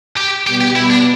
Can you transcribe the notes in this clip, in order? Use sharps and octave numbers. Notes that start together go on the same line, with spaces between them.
G4
B2 G3 B3 G4
G4
E4
D4